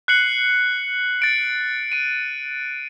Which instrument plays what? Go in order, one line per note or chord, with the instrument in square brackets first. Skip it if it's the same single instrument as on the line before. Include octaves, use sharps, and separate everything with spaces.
[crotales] F#6 C7 C#7 F#7
A6 D7
D7 D#7